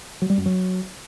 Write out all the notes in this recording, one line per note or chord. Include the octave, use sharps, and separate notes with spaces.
F#3
G3
F#2
F#3